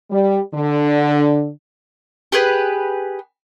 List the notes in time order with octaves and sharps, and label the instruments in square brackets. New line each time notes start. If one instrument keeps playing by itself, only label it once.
[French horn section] G3
D3
[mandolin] G4 G#4 B4